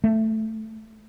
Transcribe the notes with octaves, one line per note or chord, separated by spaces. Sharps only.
A3